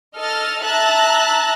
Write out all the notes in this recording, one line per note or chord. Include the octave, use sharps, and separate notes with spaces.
A4 D#5 F6 A6
E5 A5 A#5 F#6 A6 A#6